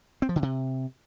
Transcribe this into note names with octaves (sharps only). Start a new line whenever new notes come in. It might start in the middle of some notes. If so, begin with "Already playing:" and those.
C4
F3
D3
C3